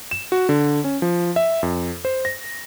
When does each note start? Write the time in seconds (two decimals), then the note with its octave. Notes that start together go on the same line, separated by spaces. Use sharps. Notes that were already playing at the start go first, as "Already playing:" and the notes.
0.11 E7
0.32 F#4
0.49 D3
0.84 C#4
1.02 F3
1.36 E5
1.63 F2
2.05 C5
2.25 A#6